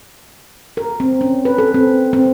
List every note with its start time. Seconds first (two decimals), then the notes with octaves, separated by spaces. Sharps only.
0.77 A#4
1.00 C4
1.21 C#4
1.45 B4
1.58 A4
1.74 C4
2.13 C4